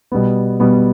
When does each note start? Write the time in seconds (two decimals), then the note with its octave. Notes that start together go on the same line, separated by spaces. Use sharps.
0.12 B2 G3 B3
0.60 B2 G3 B3